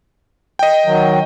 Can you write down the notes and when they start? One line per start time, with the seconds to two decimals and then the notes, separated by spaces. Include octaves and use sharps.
0.59 D#5 G5
0.86 D#3 F#3